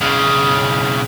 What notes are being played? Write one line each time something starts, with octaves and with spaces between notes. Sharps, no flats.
B1 C#3